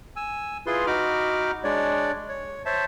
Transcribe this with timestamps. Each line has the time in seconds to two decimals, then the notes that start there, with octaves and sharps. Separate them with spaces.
0.16 G#5 E6
0.66 E4 F4 G#4 B4 C6
0.87 D#4 F#4 B5 D6 F6
1.64 G#3 D4 C#5 D5
2.29 C#5
2.66 C5 C#5 E5 A5